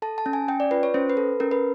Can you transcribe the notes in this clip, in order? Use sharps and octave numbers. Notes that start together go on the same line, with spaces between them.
A4 A5
A5
C#4
G#5
C#4 G5
D5
F4 B4
C#5
C#4 C5
B4
A4
C#4 A#4
B4